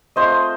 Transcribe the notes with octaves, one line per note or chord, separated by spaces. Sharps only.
A3 C4 F4 C5 D#5